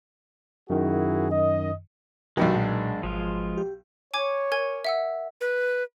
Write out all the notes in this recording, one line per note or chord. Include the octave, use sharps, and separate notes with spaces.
F#2 D#3 E4 F#4 G#4
D#5
B1 B2 D#3 G#3 D4 F#4 G4 D#5
A#2
G#1 F3 G#3 F4
G4
C#5 G#5 D6 G#6
A#4 G#5 G#6
E5 F#5 E6
B4